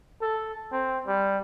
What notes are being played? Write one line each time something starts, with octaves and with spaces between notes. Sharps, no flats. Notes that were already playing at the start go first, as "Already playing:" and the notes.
A4
C4
G3